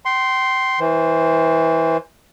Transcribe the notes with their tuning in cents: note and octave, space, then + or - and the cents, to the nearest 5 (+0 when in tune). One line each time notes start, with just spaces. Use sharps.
G5 -35 C6 +0
E3 -20 C5 +0